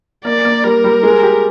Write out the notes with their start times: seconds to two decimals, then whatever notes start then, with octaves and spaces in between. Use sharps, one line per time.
0.25 A#3 D5
0.45 A#3
0.64 G3 A#4
0.84 G3
1.03 G#3
1.23 G4